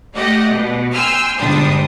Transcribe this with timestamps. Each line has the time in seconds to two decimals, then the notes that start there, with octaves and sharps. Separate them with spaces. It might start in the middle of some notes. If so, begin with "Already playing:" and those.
0.16 A3 G4 D5 D#5 F#5
0.52 B2
0.94 G5 G#5 C6 E6 F6
1.38 G1 G#2 G3 D4 C6 D#6